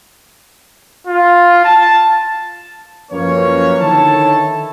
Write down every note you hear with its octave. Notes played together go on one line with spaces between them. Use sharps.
F4
A5
F#2 F3 A#3 C#4 B4 C#5
D3 D#3 E4 A4 C#5 A5